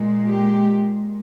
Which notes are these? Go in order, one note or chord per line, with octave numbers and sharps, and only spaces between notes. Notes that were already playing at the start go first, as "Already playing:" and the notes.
Already playing: A#2 G#3
G4